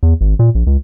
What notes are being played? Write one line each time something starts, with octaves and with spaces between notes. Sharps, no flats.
E2
G#1
A#2
A#1
C#2